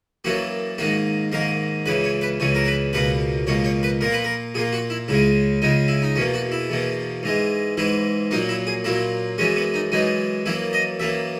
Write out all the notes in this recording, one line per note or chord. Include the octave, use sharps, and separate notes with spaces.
F#2 E3 A#3 F#4
G#2 D#3 A#3 F#4
G#2 D#3 A#3 A#4
C#2 C#3 E3 B4
C#5
B4
C#2 C#3 E3 C#5
A#4
B4
C#2 B2 A#3 B4
C#2 B2 A#3 C#5
C#5
B4
A#2 A#3 A#4
B4
A#4
A#2 A#3 G#4
F#4
E4
C#2 C#3 G#3 E4
C#2 C#3 G#3 D#4
E4
D#4
E2 B2 A#3 C#4
F#4
E4
E2 B2 A#3
G#2 E3 G#3
G#2 E3 G#3 E4
A#2 F#3 A#3 D#4
E4
G#4
A#2 F#3 A#3 E4
F#2 E3 G#3 C#4
B3
D#4
F#2 E3 G#3 D#4
F#2 E3 A#3 E4
D#5
F#2 E3 A#3 E5